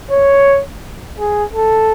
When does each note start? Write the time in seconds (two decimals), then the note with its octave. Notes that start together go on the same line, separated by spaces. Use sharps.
0.11 C#5
1.19 G#4
1.54 A4